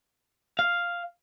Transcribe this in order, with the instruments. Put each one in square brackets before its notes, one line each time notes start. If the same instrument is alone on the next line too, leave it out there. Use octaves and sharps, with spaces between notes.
[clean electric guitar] F5